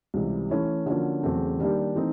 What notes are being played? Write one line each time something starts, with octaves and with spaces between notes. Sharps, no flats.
C#2 C3 E3 G3
E3 A3 C#4 E4
D3 F3 A#3 C#4 F#4
E2 C#3 F#3 A3 C4
D#3 G3 A#3 D4 G4
E3 A3 C4 D#4